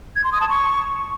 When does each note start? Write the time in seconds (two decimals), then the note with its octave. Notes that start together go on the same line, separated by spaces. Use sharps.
0.16 G#6
0.24 C6
0.32 D#6
0.41 A5
0.49 C#6